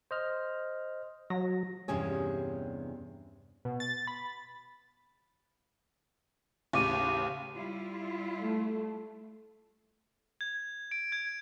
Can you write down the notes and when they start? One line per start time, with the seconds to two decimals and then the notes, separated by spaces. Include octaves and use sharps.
0.11 C5 D#5 F6
1.30 F#3 A#6
1.88 E2 G2 C3 C#4 G#4 C#5
3.65 B2
3.80 A6
4.07 B5
6.73 A1 D#2 C#3 C#6 D6 D#7
7.54 G3 E4 F4
8.41 A3
10.41 G#6
10.91 D7
11.12 G#6